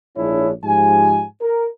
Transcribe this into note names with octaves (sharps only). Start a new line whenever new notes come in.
A#1 G#2 D4 E4 G#4 C#5
G#2 F3 G4 G#5
A#4